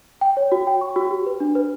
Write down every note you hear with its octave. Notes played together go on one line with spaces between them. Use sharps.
G5
C#5
F#4
G5
C#6
F#4
G4
B4
D4
B4